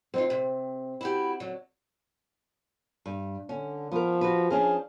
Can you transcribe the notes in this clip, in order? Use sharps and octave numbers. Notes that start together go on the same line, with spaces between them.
D3 C4 D#4 F4
C3
E4 F#4 G4
D3 F#3
G2
D3 C#4
F3 B3 A#4
F#4 B4
F3 C#4 D4 G#4